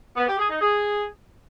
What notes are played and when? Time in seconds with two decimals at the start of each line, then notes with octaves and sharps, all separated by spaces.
0.16 B3
0.27 G4
0.39 G#4
0.50 D#4
0.61 G#4